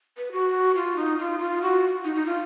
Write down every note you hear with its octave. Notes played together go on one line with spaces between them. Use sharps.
B4
F#4
F4
D#4
F4
F4
F#4
D#4
D#4
F4